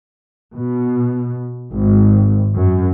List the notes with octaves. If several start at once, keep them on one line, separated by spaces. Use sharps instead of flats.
B2
G#1
F#2